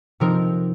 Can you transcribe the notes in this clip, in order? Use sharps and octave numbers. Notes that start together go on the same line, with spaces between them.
C3 F3 C4 D#4 A#4